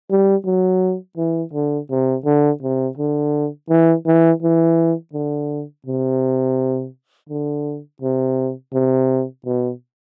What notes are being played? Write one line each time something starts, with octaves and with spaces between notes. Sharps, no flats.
G3
F#3
E3
D3
C3
D3
C3
D3
E3
E3
E3
D3
C3
D3
C3
C3
B2